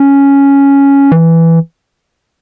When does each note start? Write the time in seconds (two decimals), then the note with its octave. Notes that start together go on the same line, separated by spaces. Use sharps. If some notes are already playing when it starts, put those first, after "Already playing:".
Already playing: C#4
1.12 E3